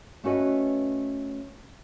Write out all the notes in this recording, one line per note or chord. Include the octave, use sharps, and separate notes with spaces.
A3 C#4 F#4 B4 D#5